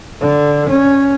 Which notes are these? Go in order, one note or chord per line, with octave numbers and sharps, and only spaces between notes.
D3
C#4